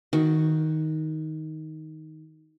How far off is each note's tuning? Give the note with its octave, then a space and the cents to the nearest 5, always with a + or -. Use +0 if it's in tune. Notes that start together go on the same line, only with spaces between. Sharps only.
D#3 +10 F#4 +0